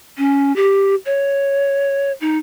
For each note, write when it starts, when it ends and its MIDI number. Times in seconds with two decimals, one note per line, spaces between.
0.18 0.55 61
0.56 0.95 67
1.06 2.12 73
2.21 2.38 63